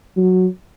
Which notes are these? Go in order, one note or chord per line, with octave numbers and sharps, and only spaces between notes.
F#3